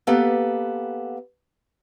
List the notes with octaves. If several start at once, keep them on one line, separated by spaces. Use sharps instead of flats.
A#3 B3 G4 A4 B4